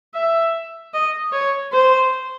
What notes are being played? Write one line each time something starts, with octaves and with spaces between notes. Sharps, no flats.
E5
D#5
C#5
C5